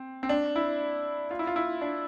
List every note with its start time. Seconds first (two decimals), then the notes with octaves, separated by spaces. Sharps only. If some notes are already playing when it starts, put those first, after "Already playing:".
Already playing: C4
0.23 C4
0.29 D4
0.56 E4
1.31 F4
1.39 E4
1.47 F4
1.56 E4
1.81 D4